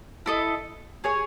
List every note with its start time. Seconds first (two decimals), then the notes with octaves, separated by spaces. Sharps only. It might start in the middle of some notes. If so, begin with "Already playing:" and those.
0.26 E4 A4 D#5
1.04 G#4 C#5 G#5